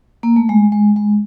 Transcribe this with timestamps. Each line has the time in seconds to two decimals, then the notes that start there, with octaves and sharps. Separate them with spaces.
0.23 A#3
0.36 A3
0.49 G#3
0.72 G#3
0.96 G#3